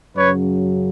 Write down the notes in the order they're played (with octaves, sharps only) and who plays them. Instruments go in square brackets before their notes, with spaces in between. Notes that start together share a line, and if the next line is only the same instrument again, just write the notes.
[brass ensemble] F#2 C#3 F#3 B4 C#5